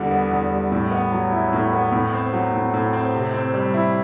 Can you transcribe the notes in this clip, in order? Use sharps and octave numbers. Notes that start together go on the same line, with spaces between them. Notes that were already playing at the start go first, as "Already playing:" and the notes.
Already playing: E2 D3 G3
B3
E2
G3
A2
B3
F#3
E4
A2
B3
A2
C4
F#3
A2
A2
C4
C3
C4
G3
E4